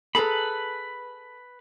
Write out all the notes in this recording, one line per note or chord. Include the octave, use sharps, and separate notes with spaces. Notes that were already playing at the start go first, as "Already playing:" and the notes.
G#4 A4 B4 A#5 B5